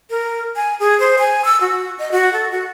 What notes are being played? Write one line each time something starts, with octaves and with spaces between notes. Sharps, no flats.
A#4
G#5
G#4
C5
G#5
E6
F#4
D#5
F#4
A4
F#4